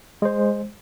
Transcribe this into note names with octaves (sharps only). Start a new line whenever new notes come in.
G#3 C5